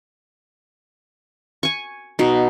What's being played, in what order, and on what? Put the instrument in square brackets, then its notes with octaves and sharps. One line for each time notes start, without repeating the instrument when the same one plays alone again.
[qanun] G#5 C#6
B2 D#4